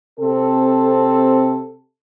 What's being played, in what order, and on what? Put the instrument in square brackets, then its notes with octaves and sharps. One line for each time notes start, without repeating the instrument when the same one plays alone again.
[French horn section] C3 C4 A4